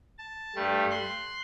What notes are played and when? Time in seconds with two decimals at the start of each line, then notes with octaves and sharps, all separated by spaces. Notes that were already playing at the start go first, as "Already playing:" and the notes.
0.18 A5
0.55 G2 G3 A3
0.91 C6 F#6